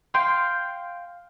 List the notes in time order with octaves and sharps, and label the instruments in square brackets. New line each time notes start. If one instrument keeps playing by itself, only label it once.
[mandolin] F5 G5 [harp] C6